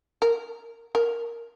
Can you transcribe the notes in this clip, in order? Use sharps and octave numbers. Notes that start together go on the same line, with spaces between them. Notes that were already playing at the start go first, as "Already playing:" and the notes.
A#4
A#4